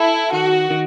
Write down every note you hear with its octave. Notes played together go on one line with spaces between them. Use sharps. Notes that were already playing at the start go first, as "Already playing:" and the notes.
Already playing: E4 A4
D#3 F#4
D#3